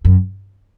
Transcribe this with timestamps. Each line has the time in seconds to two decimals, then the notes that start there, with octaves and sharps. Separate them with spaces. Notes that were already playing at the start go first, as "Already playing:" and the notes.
0.05 F#2